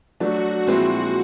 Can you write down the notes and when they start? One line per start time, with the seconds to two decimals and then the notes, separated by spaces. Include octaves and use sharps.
0.20 F#3 A3 D4 F#4
0.67 A#2 F3 G#3 C4 E4